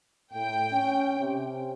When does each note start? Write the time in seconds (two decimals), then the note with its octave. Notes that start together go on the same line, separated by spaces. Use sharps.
0.33 A2 G5
0.72 C#4
1.19 C3